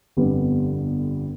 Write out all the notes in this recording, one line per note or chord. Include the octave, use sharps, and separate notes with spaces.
G1 F2 D3 G3 B3